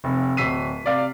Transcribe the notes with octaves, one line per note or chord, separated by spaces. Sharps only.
F1
D1 E6 B6 C7 D#7
C3 D5 F5